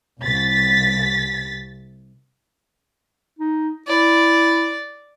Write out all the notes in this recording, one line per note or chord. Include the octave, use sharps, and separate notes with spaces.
C2 A6 B6
D#4
E4 D5